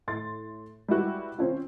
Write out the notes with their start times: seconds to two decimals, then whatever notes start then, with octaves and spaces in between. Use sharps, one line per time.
0.07 A2 C6 A6
0.88 G3 G#3 E4 F#4 B4
1.39 C4 C#4 F4